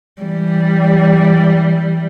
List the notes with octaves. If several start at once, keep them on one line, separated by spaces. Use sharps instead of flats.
E3 G3